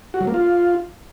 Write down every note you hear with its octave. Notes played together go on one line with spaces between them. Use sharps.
F#4
F#3
A#3
F4